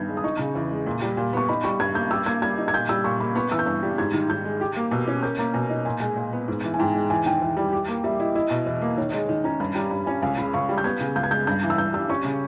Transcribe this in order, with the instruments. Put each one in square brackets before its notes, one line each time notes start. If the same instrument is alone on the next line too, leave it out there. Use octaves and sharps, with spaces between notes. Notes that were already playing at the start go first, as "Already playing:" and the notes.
Already playing: [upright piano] G2 D#3 B3 [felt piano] G6 G#6
[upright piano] G#3
[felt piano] D#6
[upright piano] D#4 [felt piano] C#6
[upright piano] C#3
E2
G#3
A#2
G3
A#2
[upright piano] B3 [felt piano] C#6
[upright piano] D#4 [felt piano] B5
[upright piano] G3 [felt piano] C#6
[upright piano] G2 [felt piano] G#6
[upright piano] A#3 [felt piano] G6
[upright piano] G4 [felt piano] E6
[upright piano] A#3 [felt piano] G#6
[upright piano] G3 [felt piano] G#6
[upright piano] D#4
[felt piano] G#6
[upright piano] A#2 [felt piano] G6
[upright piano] G3 [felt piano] E6
[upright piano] A#2 [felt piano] C#6
[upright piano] A#3 [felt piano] B5
[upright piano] B3 [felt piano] C#6
[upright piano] E3 [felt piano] E6
[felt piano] G6
[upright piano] G2 [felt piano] E6
[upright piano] G3
[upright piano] G#2 [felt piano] G#6
[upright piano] D#3
[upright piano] G#2 [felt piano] G6
[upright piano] G#3
G4
A#3
[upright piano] B2 [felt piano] E6
[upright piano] C#4
[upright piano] A#4 [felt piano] G6
[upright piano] A#3 [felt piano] A#5
[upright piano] B2 [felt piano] G#5
[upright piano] D#4
[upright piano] A#2 [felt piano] G#5
[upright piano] G#3 [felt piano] G#5
[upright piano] A#2
B3
G#2
E3
[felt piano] G#5
[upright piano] G#2 [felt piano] G5
[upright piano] G#3
[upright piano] E2 [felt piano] G#5
[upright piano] D#3 [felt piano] G5
[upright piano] E2
G3
G4
A#3
[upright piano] G3 [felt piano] E5
[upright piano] E4 [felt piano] D#5
[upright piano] E4 [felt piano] D#5
[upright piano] B2
[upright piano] E2 [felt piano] D#5
[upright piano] A#3
[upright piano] D#3 [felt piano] C#5
[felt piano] D#5
[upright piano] G#3 [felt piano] C#5
[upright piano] D#3 [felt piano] D#5
[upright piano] C#4 [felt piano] A#5
[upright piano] G2 [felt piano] B5
[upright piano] G3 [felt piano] A#5
[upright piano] G2 [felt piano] B5
[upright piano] C#4 [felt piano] G#5
[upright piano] C#2 [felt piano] G#5
[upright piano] C#3 [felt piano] B5
[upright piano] C#2 [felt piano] C#6
[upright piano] G3
[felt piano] G6
[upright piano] B3 [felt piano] G#6
[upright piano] C#3
[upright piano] C#2 [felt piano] G6
[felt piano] G#6
[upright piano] G#3 [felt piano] G6
[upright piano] G2 [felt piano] G6
[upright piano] E3
[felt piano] E6
[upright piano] G2 [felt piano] G6
[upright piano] G3 [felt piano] E6
[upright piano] C#4 [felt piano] C#6
[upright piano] C#3